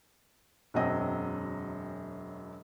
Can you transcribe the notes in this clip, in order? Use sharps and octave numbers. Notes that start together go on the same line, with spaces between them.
E1 F#2 F#3 C4 D#5